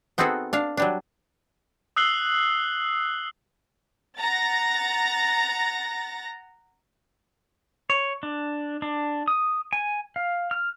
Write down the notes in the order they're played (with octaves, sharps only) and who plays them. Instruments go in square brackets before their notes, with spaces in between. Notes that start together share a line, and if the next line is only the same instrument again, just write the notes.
[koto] B3 C4 D#4 F#4 G#4 A4
D4 F5 A5
F#3 G3 D4
[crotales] D#6 E6 F#6 C7 F#7 G7
[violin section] F#5 A#5 A6 A#6
[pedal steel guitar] C#5
D4
D4
D#6
G#5
F5
F6